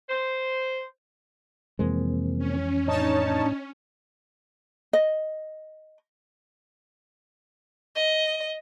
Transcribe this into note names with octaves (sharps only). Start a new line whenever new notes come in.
C5
F2 C3 E3 G#3 A#3 C4
C#4
A2 D4 D#4 C#5 A5
D#5
D#5